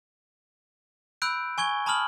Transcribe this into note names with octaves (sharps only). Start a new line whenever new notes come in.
B5 E6 F#6 G6 D7
G#5 C#6 G#6 G7
A5 B5 D#6 F6 F#7